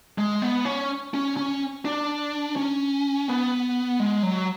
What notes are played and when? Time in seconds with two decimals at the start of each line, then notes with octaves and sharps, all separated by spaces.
0.18 G#3
0.42 B3
0.65 C#4
1.14 C#4
1.37 C#4
1.85 D4
2.56 C#4
3.28 B3
4.00 G#3
4.23 F#3